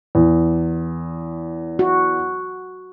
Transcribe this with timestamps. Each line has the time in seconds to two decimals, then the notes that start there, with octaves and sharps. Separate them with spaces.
0.15 E2
1.79 F#4